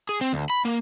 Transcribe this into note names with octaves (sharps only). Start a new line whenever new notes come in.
G#4
C4
D2
B5
A#3